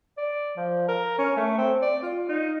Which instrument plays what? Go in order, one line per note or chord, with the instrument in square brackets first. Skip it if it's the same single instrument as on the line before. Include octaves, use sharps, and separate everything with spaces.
[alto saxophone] D5
F3
A#4
C#4
A3
C4
D5
F4
D#4